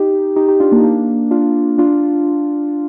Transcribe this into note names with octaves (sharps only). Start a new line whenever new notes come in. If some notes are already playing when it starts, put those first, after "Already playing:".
Already playing: D#4 G4
D#4 G4
D#4 G4
D4 F4
A#3 D4
D#4
A#3 D4
D4 F4
D4 F4